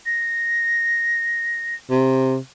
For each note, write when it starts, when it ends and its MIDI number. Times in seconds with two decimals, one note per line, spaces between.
0.06 1.75 94
1.91 2.37 48